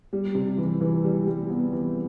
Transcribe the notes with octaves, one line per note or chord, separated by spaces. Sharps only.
G3
C3
E3
E3
G3
G3
B3
E3